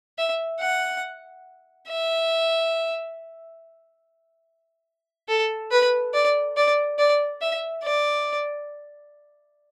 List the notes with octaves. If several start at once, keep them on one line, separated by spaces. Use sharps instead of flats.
E5
F#5
E5
A4
B4
D5
D5
D5
E5
D5